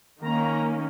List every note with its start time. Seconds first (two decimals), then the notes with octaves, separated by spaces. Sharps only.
0.24 D#3 A#3 C#4 A#5